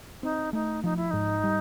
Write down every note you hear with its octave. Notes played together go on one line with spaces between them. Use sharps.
C4 D#4
A3 D#4
F3 D#4
E4
G#2 D#4
G3